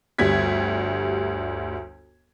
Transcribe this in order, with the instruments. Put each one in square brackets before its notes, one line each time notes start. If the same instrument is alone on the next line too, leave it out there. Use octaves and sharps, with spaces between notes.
[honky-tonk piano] G1 D2 G3 G#6 B6